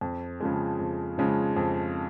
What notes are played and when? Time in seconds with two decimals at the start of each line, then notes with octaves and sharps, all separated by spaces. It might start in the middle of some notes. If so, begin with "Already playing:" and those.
0.01 F2
0.40 C#3 F3 G#3
0.80 F2
1.18 C#3 F3 G#3
1.57 F2